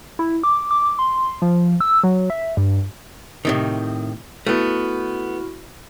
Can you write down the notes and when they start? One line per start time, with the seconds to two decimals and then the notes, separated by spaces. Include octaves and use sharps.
0.19 E4
0.43 D6
0.71 D6
0.99 C6
1.42 F3
1.81 E6
2.04 F#3
2.30 E5
2.57 G2
3.45 A2 C3 D#3
4.46 A3 B3 E4 F#4 F6